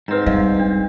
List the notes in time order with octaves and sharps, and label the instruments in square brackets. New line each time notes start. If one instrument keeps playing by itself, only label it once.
[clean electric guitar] G#2 C4 [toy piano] B4 A#5
[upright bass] G3 [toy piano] D5 D#5 F5
[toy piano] D4